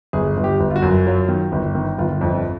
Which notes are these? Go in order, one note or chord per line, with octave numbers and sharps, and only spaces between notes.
G1 G#4
G1
G4
G1
F4
F#4
F#2
F#3 F4
D#3
G1
D#3
G1 F4
F2